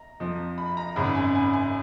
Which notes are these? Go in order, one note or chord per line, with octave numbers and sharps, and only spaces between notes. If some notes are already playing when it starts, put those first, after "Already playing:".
Already playing: A#5
F2 F3
B5
A#5
G#1 F#2 C#3 B5
G#5
G#5
G#5